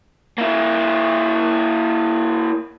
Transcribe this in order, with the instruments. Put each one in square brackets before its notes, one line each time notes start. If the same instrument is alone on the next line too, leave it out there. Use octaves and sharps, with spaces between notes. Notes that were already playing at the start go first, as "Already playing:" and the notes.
[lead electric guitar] A#3 E4